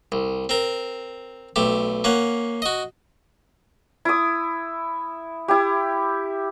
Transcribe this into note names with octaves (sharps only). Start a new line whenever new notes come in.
C2
C4 A#4
B1 A3 G4
A#3 C#4 F#5
F#4 D#5
E4 D#6
E4 G4